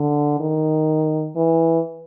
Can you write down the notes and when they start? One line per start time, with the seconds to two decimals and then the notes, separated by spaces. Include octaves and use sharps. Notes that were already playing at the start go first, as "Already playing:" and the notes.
Already playing: D3
0.40 D#3
1.36 E3